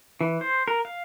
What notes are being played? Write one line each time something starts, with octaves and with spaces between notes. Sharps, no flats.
E3
C5
A#4
F5